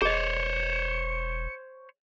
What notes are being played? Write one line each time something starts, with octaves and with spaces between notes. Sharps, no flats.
E1 G#4 C5 C#5 D#5 C#7